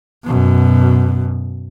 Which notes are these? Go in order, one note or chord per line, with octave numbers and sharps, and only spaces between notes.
F#2 B2